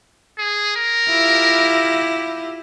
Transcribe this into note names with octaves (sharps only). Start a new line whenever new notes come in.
G#4
A#4
E4 F4 G4